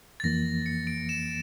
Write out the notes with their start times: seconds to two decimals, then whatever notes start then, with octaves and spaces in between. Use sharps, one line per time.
0.20 A6
0.24 F2 E3 A#3 A#6
0.66 C#7
0.87 D7
1.09 E7